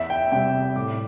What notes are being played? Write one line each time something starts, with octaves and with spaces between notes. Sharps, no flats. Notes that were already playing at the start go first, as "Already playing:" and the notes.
Already playing: E2 E5
G5
C3 G3 G5
A2 D6